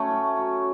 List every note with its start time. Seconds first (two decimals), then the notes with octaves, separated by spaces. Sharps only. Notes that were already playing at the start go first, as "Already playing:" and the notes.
Already playing: F#3 A3 C#4 C#5
0.11 A2
0.37 F#3